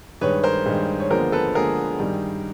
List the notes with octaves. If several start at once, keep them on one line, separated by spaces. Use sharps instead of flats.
G2 D#3 G#3 B4 C#5
A#4 C5
G2 D#3 G#3
C#5
D#2 D3 F3 G#3 B3 A#4 C5
A4 B4
D#2 D3 F3 G#3 B3 G#4 A#4
G2 D#3 G3